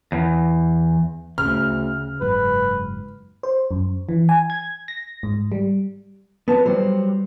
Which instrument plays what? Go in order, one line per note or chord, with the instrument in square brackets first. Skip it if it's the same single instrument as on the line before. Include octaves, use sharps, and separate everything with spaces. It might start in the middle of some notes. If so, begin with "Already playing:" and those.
[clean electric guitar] E2
[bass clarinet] D2 [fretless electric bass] C#3 [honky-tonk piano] F6
[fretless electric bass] F#1 G#2 F#3 [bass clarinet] B4
[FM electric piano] C5
F#2
E3
G#5
G#6
A#6
G#2
G3
[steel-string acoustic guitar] F#3 B4 [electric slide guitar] B3 A5
[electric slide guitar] F#3 G3 [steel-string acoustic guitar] C5